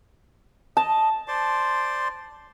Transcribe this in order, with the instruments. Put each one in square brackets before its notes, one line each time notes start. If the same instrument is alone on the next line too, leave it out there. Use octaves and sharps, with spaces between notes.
[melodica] D#5 [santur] A5
[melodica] C5 D5 C6